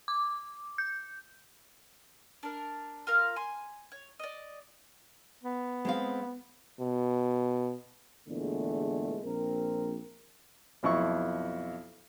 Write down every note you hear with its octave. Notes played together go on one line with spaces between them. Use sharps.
D6
G6
D4 A#4
F4 A#4 F5
G#5 C6
C#5
D5 D#5
B3
G#3 C4 F5
B2
E2 A#2 D3 E3 G#3 A3
A#1 C4 A#4
B1 F2 E4 C#6